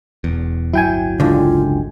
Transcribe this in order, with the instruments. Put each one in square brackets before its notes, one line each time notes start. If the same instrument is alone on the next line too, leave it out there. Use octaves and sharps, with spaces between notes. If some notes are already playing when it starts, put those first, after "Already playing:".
[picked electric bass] E1 E2
[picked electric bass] D1 G1 F#3 [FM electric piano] E4 G5 G#5
[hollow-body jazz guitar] C#2 D3 [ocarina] F4